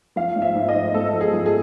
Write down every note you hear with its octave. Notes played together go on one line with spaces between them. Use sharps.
F3 F5
G#2
E5
G#2
D#5
G#2
G#2 A4
F3
G#4
F3
G#4